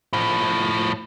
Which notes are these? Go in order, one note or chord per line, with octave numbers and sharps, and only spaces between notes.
A2 F3